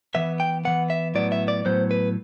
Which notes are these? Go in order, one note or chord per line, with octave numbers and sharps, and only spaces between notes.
E3 B3 E5
G5
E3 B3 F#5
E5
A2 F#3 B3 D5
E5
D5
A2 F#3 B3 C5
B4